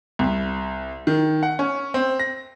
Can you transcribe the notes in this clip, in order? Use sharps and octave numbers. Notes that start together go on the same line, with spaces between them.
C2
D#3
F#5
C#4
C4
A#6